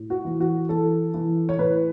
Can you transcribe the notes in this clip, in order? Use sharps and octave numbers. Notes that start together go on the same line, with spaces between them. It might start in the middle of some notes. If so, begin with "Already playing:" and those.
Already playing: A2
F#4
E3
F#4
E3 A4
E3
C#5
A2 B4